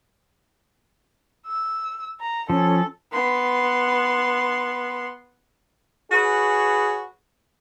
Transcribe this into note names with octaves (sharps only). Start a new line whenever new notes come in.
E6
A#5
F3 C#4 A4
B3 C6
F#4 G#4 B4 C#5